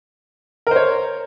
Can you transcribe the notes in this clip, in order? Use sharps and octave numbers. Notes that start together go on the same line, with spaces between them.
A#4 C5 C#5